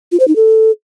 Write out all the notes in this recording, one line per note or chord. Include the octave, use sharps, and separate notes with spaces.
F4
C5
D#4
A4